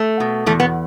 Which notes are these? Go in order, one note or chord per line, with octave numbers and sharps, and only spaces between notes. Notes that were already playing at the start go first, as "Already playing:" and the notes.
Already playing: A3
B2
E2 A3
B3